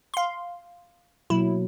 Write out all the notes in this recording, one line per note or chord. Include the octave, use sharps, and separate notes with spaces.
F5 C6
B2 F#3 A#3 E4